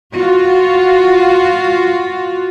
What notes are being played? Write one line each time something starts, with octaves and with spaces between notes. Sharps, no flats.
F4 F#4